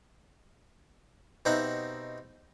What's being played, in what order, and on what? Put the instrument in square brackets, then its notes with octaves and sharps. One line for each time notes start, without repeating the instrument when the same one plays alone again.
[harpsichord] B2 C4 D#4 G4 E5 F#5